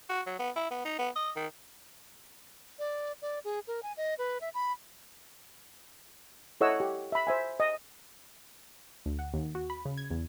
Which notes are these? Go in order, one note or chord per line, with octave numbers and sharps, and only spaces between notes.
F#4
F#3
B3
E4
B3
D#4
B3
D#5
D#3
D5
D5
G#4
A#4
G#5
D#5
B4
E5
B5
E4 A4 C#5 D#5 F#5 E6
G4
E5 B5
C5 E5 G#5
D#5
D2
F#5
D#2
F#4
B5
C#3
G#6
E2